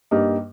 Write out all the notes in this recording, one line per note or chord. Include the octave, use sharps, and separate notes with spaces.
G2 G3 A#3 D#4